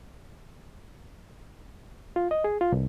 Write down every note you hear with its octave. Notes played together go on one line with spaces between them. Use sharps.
F4
D#5
G#4
F4
C2